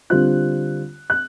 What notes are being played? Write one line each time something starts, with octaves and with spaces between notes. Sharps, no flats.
D3 G3 C4 F4 F#6
F#6